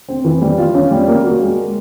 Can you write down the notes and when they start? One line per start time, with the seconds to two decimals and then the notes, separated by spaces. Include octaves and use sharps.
0.08 C4
0.24 E3
0.41 G3
0.58 F4
0.74 C#4
0.91 G3
1.08 A#3
1.24 F#4
1.41 G#3